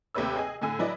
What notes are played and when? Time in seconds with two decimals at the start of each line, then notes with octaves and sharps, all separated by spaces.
0.15 D#2 C3 A3 B4 C#5 E6
0.36 G#4 D#5 G#5
0.61 A2 D3 G#5 E6
0.79 F#3 E4 B4 D5 D#5